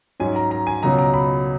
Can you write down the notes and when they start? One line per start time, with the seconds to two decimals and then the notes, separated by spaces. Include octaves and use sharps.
0.20 G#2 F#3 C#4 G#5
0.36 A#5
0.51 A#5
0.67 G#5
0.83 C#2 B2 F#3 C#4 A#5
0.99 A#5
1.14 B5